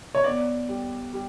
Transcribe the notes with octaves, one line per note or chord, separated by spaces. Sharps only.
C#5
B3 D5
G3
G3